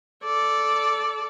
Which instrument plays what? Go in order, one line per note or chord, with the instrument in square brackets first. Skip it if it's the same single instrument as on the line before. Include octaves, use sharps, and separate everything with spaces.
[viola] A4 D5